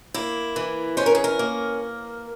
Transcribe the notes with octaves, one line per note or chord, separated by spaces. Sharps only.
A#3 E4
E3
C#4 C5
A#4
G#4
A#4
A#3